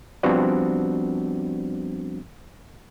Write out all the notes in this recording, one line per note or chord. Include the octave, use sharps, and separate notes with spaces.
F3 G3 B3 C4 D4 F#4